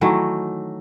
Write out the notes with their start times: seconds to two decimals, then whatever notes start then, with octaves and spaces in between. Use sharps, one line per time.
0.01 D#3 E3 F#3 A3